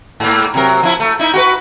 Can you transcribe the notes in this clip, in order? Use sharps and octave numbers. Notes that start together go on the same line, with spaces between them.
G#2 A#3
C3 F#3 A#4
F3 E4
A3
D#4 E4
F#4 G4 B4